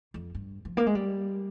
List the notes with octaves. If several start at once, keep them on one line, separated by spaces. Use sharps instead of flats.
F2
G2
F3
A#3
G#3
G3